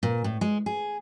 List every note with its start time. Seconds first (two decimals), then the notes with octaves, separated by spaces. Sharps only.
0.03 A#2
0.24 A2
0.41 G#3
0.66 G#4